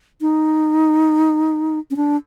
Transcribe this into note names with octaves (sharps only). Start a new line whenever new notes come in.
D#4
C#4
D4